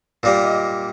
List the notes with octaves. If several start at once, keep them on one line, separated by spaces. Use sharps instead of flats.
A#2 G3 A#3 D5
D#5